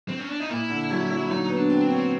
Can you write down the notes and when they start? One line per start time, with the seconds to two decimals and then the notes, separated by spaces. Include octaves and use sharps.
0.09 C4
0.19 C#4
0.29 D4
0.40 D#4
0.49 A#2 E4
0.70 D3
0.90 F#3
1.11 F#3
1.30 F#3 D#4
1.50 B3
1.57 D4
1.70 C4
1.84 C4
1.91 C#4